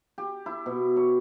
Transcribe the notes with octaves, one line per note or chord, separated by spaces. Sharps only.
G4
E4
B2
C#5